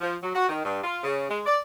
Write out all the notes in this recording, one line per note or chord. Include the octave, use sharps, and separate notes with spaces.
F3
F#3
F#4
D#3
G2
F4
C#3
G#3
D5